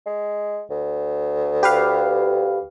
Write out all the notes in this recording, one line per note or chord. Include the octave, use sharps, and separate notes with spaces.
G#3
D2
G4 B4 F5